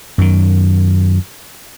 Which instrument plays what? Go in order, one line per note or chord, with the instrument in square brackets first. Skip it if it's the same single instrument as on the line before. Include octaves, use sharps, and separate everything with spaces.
[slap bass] F#2 D#3